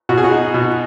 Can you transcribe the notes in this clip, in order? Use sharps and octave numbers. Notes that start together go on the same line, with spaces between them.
B2 F#4
G#4
F#4
D#4
B2